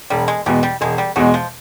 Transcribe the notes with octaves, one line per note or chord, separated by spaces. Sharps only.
E1 G3
G#3
E2 B2 G3 G#3
G3
E1 G#3
G3
E2 B2 F#3 G#3
F3